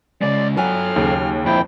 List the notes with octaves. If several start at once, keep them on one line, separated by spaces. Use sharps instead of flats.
C#3 G#3 D5
F#3 A4 G5 G#5 F6
D#2 C#3
F2 A#2 E4 G5